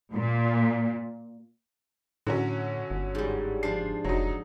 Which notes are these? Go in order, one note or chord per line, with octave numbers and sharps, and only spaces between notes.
A#2
A2 D3 F#3 C#4
G1
G#2 G3
F3 D4 C7
F1 F#3 D#4